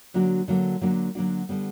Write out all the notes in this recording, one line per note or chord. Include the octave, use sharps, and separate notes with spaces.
D3 F#3 A#3 D4 F#4
D3 F#3 A#3 D4 F#4
D3 F#3 A#3 D4 F#4
D3 F#3 A#3 D4 F#4
D3 G3 B3